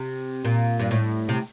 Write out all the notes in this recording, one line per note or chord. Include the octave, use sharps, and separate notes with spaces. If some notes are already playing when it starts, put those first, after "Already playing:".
Already playing: C3
A#2
G2
A2
C3